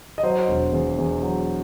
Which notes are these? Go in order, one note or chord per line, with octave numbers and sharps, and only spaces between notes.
D#5
F#3 C5
E1
E2
E2
F#3